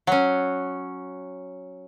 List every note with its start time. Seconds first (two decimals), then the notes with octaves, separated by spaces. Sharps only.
0.07 F#3 C#4